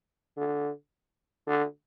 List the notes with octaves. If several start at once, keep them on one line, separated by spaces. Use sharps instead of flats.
D3
D3